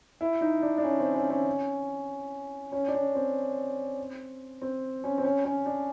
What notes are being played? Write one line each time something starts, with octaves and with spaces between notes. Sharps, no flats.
E4
D#4
D4
D4
C#4
C4
C#4
C#4
C#4
D4
C#4
C4
C4
C#4
C4
C#4
C#4
D4